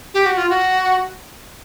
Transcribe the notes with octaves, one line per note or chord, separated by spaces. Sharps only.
G4
F#4
F4
F#4